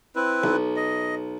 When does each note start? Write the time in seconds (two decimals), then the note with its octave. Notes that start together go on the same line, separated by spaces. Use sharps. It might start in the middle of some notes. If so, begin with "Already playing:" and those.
0.15 C4 E4 B4
0.44 B1
0.76 D#5